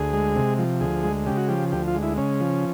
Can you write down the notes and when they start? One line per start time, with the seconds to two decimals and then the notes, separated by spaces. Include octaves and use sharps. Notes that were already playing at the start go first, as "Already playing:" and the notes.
Already playing: D2 G#4
0.13 G#3
0.35 C3
0.58 F3
0.80 D2 G#4
1.03 G#3
1.26 C#3 G4
1.37 F#4
1.48 F3 G4
1.72 D2 G4
1.88 F4
1.95 G#3
2.03 E4
2.17 C#3 C#4
2.40 F3